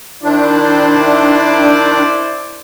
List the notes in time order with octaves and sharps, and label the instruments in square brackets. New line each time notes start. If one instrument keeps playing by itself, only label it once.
[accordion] D#3 D4 [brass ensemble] E4 C5 D5